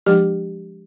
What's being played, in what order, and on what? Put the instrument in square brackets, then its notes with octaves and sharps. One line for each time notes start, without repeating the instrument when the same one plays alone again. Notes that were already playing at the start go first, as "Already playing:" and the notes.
[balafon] F3 G#3 D4 G4